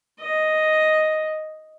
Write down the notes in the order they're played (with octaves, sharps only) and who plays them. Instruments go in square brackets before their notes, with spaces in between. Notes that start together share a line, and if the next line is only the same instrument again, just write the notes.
[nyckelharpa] D#5